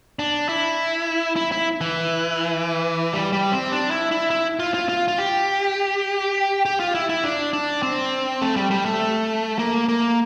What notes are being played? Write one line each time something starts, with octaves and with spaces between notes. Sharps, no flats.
D4
E4
E4
E4
E3
G3
G3
C4
D4
E4
E4
E4
F4
F4
F4
F4
G4
G4
F4
E4
E4
D4
D4
C4
A3
G3
G3
A3
A#3
A#3